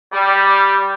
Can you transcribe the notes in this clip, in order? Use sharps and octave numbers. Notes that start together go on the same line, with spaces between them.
G3